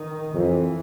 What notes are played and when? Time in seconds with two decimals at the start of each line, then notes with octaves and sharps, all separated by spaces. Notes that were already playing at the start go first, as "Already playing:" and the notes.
Already playing: D#3
0.35 F2 E3